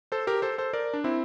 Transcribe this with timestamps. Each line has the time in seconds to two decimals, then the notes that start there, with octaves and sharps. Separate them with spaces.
0.12 A4 C5
0.27 G4 A#4
0.42 A4 C5
0.58 A4 C5
0.73 A#4 D5
0.94 D4
1.04 C4 E4